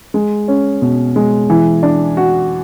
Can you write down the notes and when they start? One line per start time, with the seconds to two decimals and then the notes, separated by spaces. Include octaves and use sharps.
0.14 G#3
0.48 C#4
0.82 B2
1.16 G#3
1.50 E3
1.83 D4
2.17 F#4